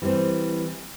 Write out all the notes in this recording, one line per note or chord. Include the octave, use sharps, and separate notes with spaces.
E3 G3 C4